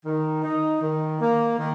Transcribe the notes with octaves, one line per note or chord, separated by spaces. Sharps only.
D#3
D#4
D#3
A#3
D#3